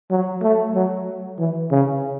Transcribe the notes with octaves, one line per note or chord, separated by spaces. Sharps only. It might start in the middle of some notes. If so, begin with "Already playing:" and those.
F#3
A3
F#3
E3
C#3